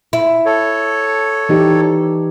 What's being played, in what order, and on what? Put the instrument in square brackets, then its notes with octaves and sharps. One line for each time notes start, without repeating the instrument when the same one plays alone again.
[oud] E4
[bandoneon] A4 C#5
[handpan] E3 D#4 G4